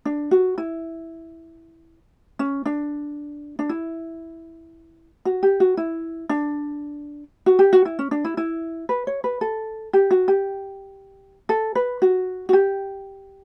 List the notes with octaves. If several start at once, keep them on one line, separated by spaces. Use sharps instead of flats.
D4
F#4
E4
C#4
D4
D4
E4
F#4
G4
F#4
E4
D4
F#4
G4
F#4
E4
C#4
D4
E4
E4
B4
C#5
B4
A4
G4
F#4
G4
A4
B4
F#4
F#4
G4